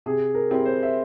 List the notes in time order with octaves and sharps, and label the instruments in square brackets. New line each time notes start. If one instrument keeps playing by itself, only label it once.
[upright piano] C3 [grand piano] G#4
[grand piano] A#4
[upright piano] G3 C4 E4 G4
[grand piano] C5
E5